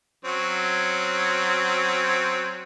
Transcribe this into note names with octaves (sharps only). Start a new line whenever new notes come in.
F#3 C4 C#4